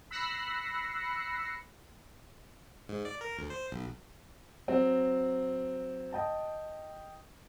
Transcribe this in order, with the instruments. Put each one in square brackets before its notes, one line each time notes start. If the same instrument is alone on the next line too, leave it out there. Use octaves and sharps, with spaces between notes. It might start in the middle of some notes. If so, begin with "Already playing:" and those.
[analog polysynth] B5 E6 F#6 A#6 C7 C#7
[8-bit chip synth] G#2
D5
A#4
D2
C5
B1
[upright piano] F#3 C4
D#5 G5 A5